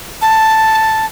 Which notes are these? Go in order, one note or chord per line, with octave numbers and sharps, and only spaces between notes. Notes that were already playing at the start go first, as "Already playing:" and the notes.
A5